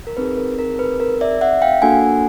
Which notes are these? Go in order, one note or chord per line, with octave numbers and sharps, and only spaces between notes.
A#4
C4 D#4 G#4 B4
A#4
A#4
B4
A#4
D5 E5
E5 F#5
F5 G5
A#3 D4 F#4 A4 F#5 G#5